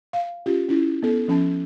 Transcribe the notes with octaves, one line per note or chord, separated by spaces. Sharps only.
F5
C#4 F4 G4
C#4 E4
B3 A4
F3 C#4 A5